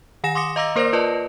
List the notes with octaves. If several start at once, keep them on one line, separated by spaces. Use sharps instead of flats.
D#3 F#5 G#5 A#6 E7
C6 D6 D#6 A#6 C#7
D#5 F5 A#5 D6 E6 A#6
A#3 A#4 C5 D5 A#6
F4 B4 D5 D#5 A5